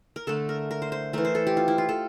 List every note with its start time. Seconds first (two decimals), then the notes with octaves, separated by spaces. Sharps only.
0.16 A#4
0.27 D3 A3 A4
0.49 A#4
0.71 A#4
0.82 C5
0.92 C5
1.13 E3 A3 A#4
1.25 C5
1.35 A4
1.47 G4
1.57 F4
1.68 E4
1.78 F4
1.89 A4